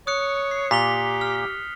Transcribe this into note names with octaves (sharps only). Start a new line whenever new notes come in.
C#5 D#6 F#6 C#7
C7
A#2 G4 B6 F7 G7
F6